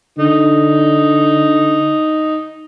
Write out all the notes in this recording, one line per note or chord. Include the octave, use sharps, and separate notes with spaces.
D3 D#4